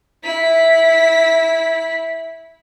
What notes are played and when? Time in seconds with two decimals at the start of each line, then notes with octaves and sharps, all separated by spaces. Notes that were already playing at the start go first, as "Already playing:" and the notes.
0.23 E4 B6